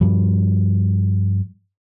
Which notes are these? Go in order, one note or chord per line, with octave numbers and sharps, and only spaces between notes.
G2 F3 G3